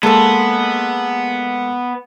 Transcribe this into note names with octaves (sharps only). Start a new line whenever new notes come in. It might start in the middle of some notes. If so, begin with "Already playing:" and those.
G#3 A#3 B3 A4 A5 C6